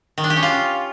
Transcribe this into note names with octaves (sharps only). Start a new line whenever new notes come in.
D#3
D4
G4
C#4
F4